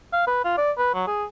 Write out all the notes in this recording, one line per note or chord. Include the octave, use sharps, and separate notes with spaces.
F5
B4
F4
D5
B4
F#3
G#4